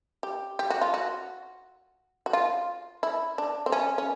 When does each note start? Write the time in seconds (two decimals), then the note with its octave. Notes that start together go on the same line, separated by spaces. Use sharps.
0.23 G4
0.59 G4
0.70 F#4
0.81 F4
0.94 F#4
2.26 F#4
2.33 F4
3.03 E4
3.38 D4
3.66 C4
3.72 C#4
3.98 C#4